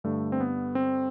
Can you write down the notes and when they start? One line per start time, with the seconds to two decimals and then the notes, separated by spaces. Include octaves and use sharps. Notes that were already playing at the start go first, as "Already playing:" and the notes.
0.04 G2 D3 A3
0.32 C4
0.40 B3
0.75 C4